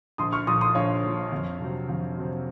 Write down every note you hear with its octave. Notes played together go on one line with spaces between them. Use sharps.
A#1 C6 D#6
C#6 F6
A#2 F3 C6 D#6
C6 D#6
A#1 C#5 F5
A#2 F3
F2
C3 F#3 C4
F2
C3 F#3 C4